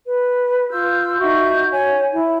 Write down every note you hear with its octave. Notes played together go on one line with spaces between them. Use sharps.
B4
F4 C6 E6 G6
D#4 F#4 E5 G6
C#5 G#5
E4